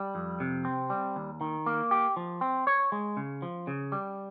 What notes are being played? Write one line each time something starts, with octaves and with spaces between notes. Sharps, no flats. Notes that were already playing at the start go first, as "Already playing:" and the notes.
Already playing: G3
F2
C3
C4
G3
D#2
D#3
A#3
G4
F3
C4
C#5
G#3
C#3
F3
C#3
G3